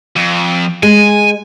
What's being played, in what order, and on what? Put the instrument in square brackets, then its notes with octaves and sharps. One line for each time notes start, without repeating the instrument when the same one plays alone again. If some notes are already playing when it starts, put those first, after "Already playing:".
[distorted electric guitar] F2
[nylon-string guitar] G#3 [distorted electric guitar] G#5